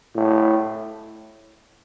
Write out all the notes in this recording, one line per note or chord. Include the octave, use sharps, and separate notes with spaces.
A2